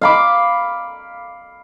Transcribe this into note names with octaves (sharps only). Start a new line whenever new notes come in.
F5 B5 D6